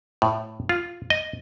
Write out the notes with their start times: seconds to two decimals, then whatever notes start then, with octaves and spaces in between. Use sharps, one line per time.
0.22 A2
0.69 F4
1.10 D#5